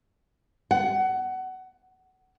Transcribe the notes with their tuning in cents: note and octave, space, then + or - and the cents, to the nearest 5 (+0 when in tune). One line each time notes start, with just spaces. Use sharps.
F#5 +20